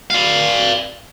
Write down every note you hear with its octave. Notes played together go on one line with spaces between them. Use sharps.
D5 F5